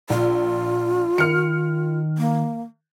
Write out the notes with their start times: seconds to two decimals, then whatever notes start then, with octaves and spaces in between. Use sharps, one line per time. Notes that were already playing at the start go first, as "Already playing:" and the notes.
0.10 A#1 F4
1.18 D#3 F6 C#7
2.18 A#3